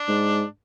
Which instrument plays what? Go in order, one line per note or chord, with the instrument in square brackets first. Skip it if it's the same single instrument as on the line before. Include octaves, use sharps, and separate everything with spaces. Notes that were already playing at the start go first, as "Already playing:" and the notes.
Already playing: [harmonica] D4
[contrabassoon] G#2